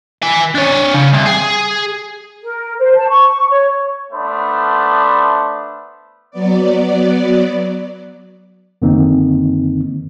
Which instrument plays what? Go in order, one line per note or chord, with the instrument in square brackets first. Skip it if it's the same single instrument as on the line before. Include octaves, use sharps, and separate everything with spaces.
[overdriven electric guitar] B4 G#5
D4 C#5
C#3
C2
G#4
[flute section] A#4
C5
A5
C#6
C#5
[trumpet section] A3 B3 D4 C5 B5
[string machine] F#3 B3 D5
[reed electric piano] F#2 D3 D#3 A#3 C4 D#4